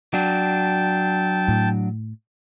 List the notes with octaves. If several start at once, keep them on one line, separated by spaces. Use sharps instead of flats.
F#3 D4 G5 A5
A2